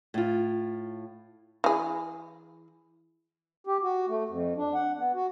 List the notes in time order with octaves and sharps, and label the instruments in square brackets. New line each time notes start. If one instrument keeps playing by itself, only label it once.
[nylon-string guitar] A2 F4
[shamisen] E3 G#4
[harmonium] G4
F#4
A3
F2
D4
F#5
B3
F#4